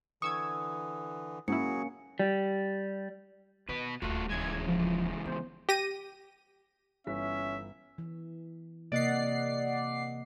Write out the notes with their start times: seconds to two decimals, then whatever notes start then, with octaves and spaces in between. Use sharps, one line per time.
0.22 D3 E3 C#6 D#6 E6 G#6
1.48 G#2 F#3 A#3 C#4 E4 F#4 G#4 C#7
2.20 G3
3.69 B2 D#3 B4
4.02 D#1 D2 A3 F4 F#4
4.29 C#3 E3 G#3 G#6
4.66 F3
5.26 B3 C5
5.69 G4 A#6 D#7
7.07 G1 E3 C#4 E5 B6
7.98 E3
8.92 C3 A#3 D5 D#5 F#5 C7